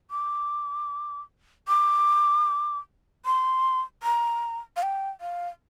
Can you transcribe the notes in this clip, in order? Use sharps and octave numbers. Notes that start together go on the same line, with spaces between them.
D6
D6
C6
A#5
F5
G5
F5